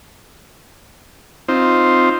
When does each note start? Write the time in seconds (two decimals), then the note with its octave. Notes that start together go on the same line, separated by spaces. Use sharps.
1.48 C4 D#4 F4 C5